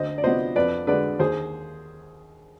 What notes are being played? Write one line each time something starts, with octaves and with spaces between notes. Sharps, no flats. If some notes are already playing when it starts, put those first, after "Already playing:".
Already playing: D2 C5 D#5
D5
C3 F3 B3 C5 D#5
F2 B4 D5
D3 G#3 B4 D5
D#2 G#4 C5